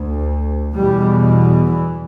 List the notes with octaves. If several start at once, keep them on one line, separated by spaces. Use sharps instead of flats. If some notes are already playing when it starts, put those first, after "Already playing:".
Already playing: D2
E2 B2 G3
E3